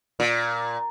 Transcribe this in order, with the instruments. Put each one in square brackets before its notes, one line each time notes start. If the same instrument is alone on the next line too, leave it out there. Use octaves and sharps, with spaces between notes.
[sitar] A#2